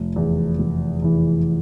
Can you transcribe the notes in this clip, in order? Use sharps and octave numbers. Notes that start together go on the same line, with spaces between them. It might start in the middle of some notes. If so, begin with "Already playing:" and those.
Already playing: F1
E2 E3
F1
E2 E3